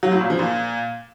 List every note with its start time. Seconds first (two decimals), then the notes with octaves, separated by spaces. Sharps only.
0.03 F#3
0.12 A2
0.21 A#2
0.30 F3
0.39 A#2